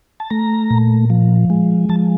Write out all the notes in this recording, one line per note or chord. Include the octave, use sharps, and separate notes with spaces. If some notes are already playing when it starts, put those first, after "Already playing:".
A5
A3 A#5
A#2
F3
G#3
F3 A5